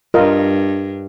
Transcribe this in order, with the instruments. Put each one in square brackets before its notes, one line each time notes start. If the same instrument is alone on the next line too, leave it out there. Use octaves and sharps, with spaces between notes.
[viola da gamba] G2 [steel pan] F4 A#4 D#5